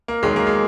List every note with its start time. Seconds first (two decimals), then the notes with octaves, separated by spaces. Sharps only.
0.08 A#3
0.22 E2 D#3 F#3 G#3
0.36 A#3
0.47 G#3